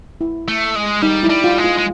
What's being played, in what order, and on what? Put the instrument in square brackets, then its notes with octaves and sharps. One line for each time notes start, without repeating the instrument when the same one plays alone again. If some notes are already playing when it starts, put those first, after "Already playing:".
[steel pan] E4
[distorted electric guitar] A3
G#3
[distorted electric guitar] G3 [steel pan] D#4
[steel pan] E4
[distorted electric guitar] G3
[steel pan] F4
[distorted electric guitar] G#3
[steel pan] F4
[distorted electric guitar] G#3